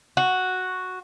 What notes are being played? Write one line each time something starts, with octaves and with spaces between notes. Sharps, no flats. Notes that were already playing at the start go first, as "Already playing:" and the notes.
F#4